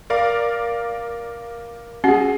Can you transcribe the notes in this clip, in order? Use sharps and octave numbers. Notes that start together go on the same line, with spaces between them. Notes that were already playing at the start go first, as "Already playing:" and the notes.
A#4 D5 F5
C#4 F#4 G#4 C7